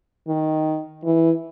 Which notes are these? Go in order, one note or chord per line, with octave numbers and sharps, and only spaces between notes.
D#3
E3